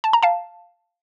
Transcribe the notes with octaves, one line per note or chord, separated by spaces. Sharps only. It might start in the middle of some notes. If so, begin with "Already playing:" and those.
A5
A#5
F5 A5